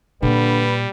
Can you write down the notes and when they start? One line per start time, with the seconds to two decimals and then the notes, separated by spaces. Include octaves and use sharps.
0.23 A#2 D3 G3 A#3 B4